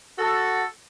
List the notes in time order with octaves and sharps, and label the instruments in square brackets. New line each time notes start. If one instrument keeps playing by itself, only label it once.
[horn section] F#4 A4